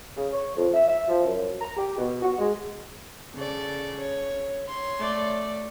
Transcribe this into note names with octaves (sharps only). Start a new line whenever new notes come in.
C#3
C#5
F2
E5
E5
F3
F#2
A#5
G4
B2
F#4
G#3
C#3 A4 D5
C#5
C#5 C6
A3 D5